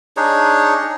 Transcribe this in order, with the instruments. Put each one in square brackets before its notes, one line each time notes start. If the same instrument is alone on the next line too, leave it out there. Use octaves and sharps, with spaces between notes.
[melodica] D4 D#4 G#4 C#5